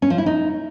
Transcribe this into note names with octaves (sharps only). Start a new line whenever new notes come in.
C#4
F3
E4
D#4